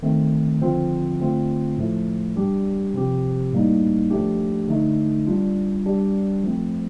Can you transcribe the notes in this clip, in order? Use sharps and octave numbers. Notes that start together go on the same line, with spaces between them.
D#3 A3 C4
D3 F3 C4 F4
D3 A3 C4 F4
A2 F3 A3
G3 D4 G4
C3 F3 C4 G4
A2 G3 A#3 D#4
F3 A3 D4 G4
D3 A3 D#4
G3 D4 F4
G3 D4 G4
F3 A3 C4